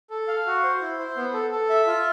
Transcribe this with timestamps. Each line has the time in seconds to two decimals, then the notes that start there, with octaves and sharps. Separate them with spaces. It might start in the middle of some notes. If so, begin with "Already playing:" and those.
0.10 A4
0.28 F5
0.46 F#4
0.63 C5
0.81 E4
0.99 C5
1.17 B3
1.33 A4
1.51 A4
1.70 E5
1.86 F4